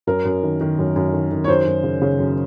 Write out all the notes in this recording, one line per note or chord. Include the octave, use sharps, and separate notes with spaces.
F#2 A#4
F#2
D#3
D#3
F#2
F#2
D#3
D#3
C#5
F#2 C5
F#2
C#3
C#3
F#2